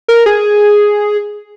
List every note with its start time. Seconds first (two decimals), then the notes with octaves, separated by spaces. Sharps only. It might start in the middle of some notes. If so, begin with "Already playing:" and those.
0.08 A#4
0.26 G#4